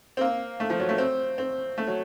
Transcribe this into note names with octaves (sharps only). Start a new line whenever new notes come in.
C4
A#3
A3
F3
F#3
A3
C4
C4
A3
F#3